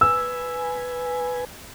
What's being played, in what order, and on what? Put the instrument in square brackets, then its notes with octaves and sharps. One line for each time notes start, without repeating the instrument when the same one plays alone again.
[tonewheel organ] B4 G#5 [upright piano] E6